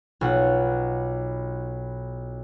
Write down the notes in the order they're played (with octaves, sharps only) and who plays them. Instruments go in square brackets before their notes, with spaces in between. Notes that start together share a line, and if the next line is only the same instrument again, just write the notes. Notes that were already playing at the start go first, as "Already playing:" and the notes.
[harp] B1 F4 F#5